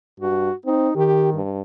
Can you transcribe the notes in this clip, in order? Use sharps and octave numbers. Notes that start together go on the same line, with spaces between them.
G2 F#4
C4 D#4
D#3 G4
G2